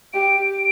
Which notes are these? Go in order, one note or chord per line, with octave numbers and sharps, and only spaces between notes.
G4 D7